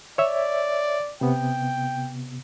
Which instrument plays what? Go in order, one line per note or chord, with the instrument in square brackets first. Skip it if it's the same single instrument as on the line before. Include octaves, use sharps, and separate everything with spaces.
[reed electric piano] C#5 E5 [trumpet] D5
[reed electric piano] C3 B3 [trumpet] G5